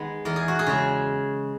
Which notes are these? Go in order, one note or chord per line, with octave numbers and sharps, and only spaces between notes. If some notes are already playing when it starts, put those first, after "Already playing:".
Already playing: D#3 G#3 B3
E2 A#4
G#4
F#4
G#4
C#3 G#3